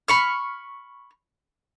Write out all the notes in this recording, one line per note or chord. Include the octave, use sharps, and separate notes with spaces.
B5 C#6 F6